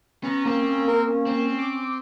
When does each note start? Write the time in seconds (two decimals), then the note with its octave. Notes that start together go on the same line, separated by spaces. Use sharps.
0.24 B3 C#4 A#5
0.46 A#3 C4
0.87 A#4
1.09 C#4
1.27 C4
1.58 D6